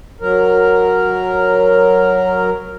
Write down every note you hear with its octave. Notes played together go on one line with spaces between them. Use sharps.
F#3 A#4